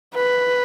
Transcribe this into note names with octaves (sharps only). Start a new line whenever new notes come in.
B4